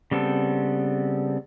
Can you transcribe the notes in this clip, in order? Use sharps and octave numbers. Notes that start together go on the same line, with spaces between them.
C#3 G3 B3 C4 A4